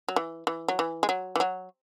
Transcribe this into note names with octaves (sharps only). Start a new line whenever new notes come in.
F#3
E3
E3
F#3
E3
G#3
F#3
E3
F#3